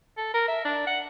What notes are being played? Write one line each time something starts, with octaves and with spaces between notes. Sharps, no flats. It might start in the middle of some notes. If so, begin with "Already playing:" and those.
A4
A#4
E5
D4
F#5